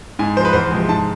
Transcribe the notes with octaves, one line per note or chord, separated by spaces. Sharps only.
G#2 G#5
F3 G#3 B4 C5
E2 C5
C3 F3 G#3
G#2 A5